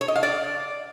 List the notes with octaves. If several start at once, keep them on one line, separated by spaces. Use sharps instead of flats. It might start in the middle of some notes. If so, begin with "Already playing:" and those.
C#5
D#5
F5
D5